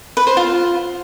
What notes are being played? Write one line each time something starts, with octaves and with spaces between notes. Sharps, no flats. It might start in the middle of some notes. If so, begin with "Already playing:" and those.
B4
C5
F4